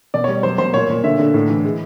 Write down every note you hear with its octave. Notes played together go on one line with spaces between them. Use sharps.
B2 D5
C#5
G3
F#3 C5
B2 C5
A#2 C#5
A#2
D3 E5
D3
A2
E3
G#3